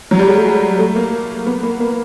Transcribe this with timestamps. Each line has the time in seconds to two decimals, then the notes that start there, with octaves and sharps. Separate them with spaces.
0.11 F#3
0.19 G3
0.27 G#3
0.37 A3
0.45 G#3
0.79 A3
0.96 A#3
1.47 B3
1.63 A#3
1.80 A#3